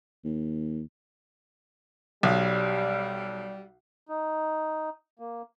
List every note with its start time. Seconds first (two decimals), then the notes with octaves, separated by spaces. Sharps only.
0.24 D#2
2.23 B1 G3
4.09 D#4
5.19 A#3